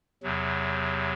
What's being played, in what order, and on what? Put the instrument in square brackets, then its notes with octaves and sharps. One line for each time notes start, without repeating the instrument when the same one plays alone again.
[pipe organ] E2 C3 F#3